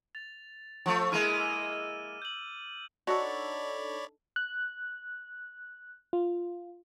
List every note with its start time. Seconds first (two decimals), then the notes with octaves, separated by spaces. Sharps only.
0.15 A6 F7
0.86 F3 A3
1.12 G#3 A#3 E4 F6 D#7
1.37 D6 E6
2.22 G6 F#7
3.07 D4 D#4 F#4 A4 C#5 D5 B5
4.36 F#6
6.13 F4